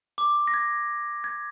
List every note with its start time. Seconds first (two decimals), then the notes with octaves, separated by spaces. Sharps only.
0.18 D6
0.48 A#6
0.54 G#6
1.24 G#6